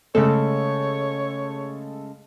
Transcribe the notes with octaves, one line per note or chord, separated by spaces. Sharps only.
C#3 G#3 A3 A4 C#5